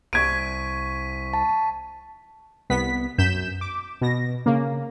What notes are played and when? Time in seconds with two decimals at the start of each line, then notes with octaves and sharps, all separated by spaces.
0.13 C2 C#6 G#6 B6 D7 D#7
1.33 A5
2.70 C2 B3 B6
3.18 F#2 G6 B6 E7
3.61 D6
4.01 B2 A#6
4.46 C#3 A#3